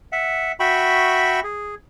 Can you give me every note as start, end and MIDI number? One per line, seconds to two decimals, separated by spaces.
0.12 0.52 76
0.12 0.52 78
0.60 1.40 66
0.60 1.40 76
0.60 1.40 79
0.60 1.40 83
0.60 1.40 85
1.44 1.75 68